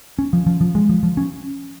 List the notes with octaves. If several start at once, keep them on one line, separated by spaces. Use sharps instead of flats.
C#4
F3
F3
F3
G#3
F3
F3
C#4